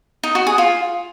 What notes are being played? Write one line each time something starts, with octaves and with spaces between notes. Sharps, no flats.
D#4
F#4
G#4
F4